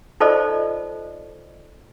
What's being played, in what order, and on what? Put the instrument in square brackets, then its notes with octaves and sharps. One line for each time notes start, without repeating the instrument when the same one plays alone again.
[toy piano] D#4 F4 A4 C5 D5 D#5